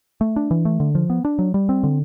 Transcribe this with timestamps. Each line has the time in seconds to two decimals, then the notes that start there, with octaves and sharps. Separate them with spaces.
0.21 A3
0.36 D4
0.51 E3
0.65 A3
0.80 D3
0.95 F3
1.10 B3
1.25 D4
1.39 F#3
1.54 G3
1.69 C4
1.83 D3